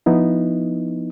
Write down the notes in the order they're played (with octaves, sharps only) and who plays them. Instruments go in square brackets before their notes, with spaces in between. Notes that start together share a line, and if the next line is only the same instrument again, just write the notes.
[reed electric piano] F3 B3 D#4 E4